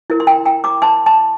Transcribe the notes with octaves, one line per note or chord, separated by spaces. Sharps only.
E4 A#4
C6
G5 A#5
G5 A#5
A#5 D6
A5 C6
A5 C6